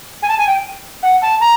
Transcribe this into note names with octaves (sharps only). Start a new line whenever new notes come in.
G#5
A5
G#5
G5
F#5
A5
A#5